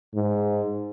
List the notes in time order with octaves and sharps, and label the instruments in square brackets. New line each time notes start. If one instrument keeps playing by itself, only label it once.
[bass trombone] G#2